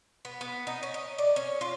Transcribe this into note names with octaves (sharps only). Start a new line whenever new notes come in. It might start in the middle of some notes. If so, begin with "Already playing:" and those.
B3
B3
D#4
C#4
D#5
D5
C#4
F4